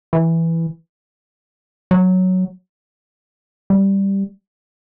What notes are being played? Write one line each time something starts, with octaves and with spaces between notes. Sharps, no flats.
E3
F#3
G3